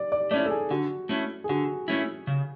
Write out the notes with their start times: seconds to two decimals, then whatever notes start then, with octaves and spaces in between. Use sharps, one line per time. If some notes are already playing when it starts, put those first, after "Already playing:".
Already playing: D5
0.12 D5
0.31 A3 C#4 E4 D5
0.46 A4
0.50 G#4
0.71 D3 F#4
1.09 A3 C#4 E4
1.44 G#4
1.49 D3 F#4
1.88 A3 C#4 E4
2.27 C#3